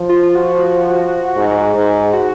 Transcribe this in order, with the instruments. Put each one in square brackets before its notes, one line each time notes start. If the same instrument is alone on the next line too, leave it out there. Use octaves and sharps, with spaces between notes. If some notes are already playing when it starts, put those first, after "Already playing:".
Already playing: [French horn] F3
[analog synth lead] F4
F4
F#4
[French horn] G#2
G#2
[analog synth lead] F#4